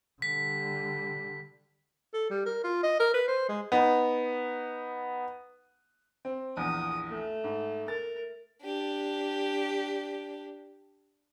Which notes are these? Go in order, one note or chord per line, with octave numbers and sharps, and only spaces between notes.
D3 G3 B6
A4
G3
A#4
F4
D#5
A#4
B4
C5
G#3
B3 D#4
C4
A#1 E2 D#6
A3
G#2
A#4 A6
D4 G4